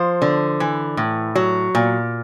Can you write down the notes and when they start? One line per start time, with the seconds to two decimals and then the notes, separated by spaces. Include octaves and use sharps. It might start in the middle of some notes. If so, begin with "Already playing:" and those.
Already playing: F3 C5
0.22 D3
0.60 E3
0.97 A2
1.35 F#3
1.75 A#2